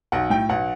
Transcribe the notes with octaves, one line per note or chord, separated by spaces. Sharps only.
B1 F#5
A2 G5
B1 F#5